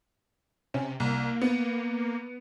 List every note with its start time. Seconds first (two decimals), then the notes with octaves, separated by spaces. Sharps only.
0.74 C3 C#4
1.00 C2 A#3
1.42 B3